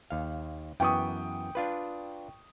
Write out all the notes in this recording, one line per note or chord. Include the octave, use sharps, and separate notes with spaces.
D#2 F5
F#2 E3 B3 G5 C#6 D#6
D4 F4 B4